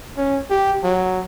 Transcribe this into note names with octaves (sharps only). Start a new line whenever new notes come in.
C#4
G4
F#3